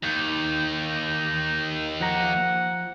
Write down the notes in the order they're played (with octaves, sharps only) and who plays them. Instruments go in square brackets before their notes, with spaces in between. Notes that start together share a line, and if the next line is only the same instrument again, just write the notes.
[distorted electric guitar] D#2 [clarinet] D#4
[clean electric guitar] F3 A#5 [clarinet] F#5